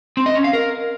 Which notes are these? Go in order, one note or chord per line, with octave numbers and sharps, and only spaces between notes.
C4
D#5
C#4
F5
A#4